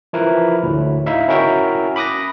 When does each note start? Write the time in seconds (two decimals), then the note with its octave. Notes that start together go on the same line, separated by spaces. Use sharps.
0.13 F3 E4 A#4 B4
0.63 D2 A2
1.06 D#4 E4 E5 F5
1.28 C#4 E4 F#4 A#4 E5 G5
1.96 B5 D6 D#6 F#6 A#6